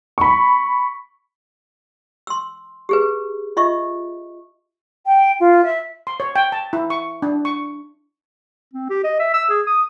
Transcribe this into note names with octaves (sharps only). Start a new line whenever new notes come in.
B5 C#6
C6 E6
G4 G#4 B4
F4 D#5 E5 C#6
G5
F4
E5
C6
C#5
G5
A5
E4
C#6
D4
C#6
C4
G4
D#5
E5
E6
G#4
D#6